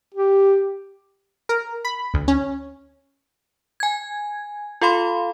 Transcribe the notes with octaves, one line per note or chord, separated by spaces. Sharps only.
G4
A#4
B5
D2
C#4
G#5 G#6
F4 A4 F5 B5 C6